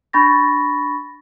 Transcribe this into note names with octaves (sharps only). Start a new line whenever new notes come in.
D4 B5 C#6 A6 A#6